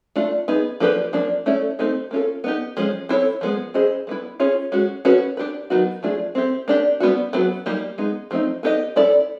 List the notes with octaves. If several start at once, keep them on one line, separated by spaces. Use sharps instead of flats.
A3 D4 F4
B3 D#4 G#4
F3 A#3 D4 G4 B4
F3 A#3 D4
A3 C#4 E4 A4 D5
A3 C4 D#4 G4
A#3 C#4 F4 A4
B3 D#4 G4
F3 G#3 C#4
C4 E4 A4 C#5
F3 G#3 B3
C#4 E4 G#4 C5 D#5
G3 B3 E4
C#4 F4 G#4 C#5
G#3 C#4 F#4
C#4 F#4 B4
D4 G4 B4
D#3 F#3 B3 D#4 F#4
F3 A3 D4 F4 G#4
C4 E4 G4
A#3 D4 G4
G3 B3 D4 F#4
F#3 B3 D4 F#4 B4
G3 A#3 D#4 G4
G#3 B3 D#4
F3 A3 C4 D#4
B3 D#4 G4 A#4 D#5
C#4 E4 A4 D5